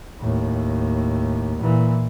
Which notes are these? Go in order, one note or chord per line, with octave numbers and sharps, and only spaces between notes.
D#2 A2
A#2 E3